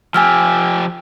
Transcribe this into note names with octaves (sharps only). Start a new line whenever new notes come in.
F3 G4 G#5 E6 F6